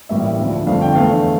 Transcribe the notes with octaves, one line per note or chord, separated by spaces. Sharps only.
A1 A2 G3 A#3 E5
D2 D3 F3
G1 F2 D3 A3 F5
G5
E2 D3 A3 F5